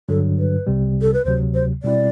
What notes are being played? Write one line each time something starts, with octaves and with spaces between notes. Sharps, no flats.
G2 D3 F#3 A4
B4
C2 C3 G3
A4
B4
D2 C3 F#3 C5
C5
B2 G3 C4 E4 D5